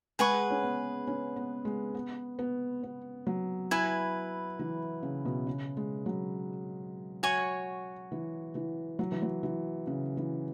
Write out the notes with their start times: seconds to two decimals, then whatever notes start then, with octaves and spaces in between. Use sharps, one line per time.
0.19 G#3 G#4 B4 F#5 C#6
0.50 C#4
0.63 B3
1.07 C#4
1.36 B3
1.65 G#3
1.95 B3
2.39 B3
2.83 B3
3.27 F#3
3.71 E4 B4 G#5
4.59 E3
5.03 C#3
5.25 B2
5.47 C#3
5.77 G#3
6.06 F#3
7.23 F#4 C#5 G#5 C#6
8.12 E3
8.55 E3
8.99 F#3
9.12 E3
9.22 F#3
9.43 E3
9.87 C#3
10.17 E3